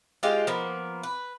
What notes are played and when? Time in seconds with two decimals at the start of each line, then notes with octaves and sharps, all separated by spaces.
0.23 G#3 F4 G4 F5
0.47 F3 A#3 B3
1.03 B4